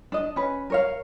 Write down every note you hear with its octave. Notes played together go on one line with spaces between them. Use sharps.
D4 D#5
C#4 B4
A#4 C#5 F5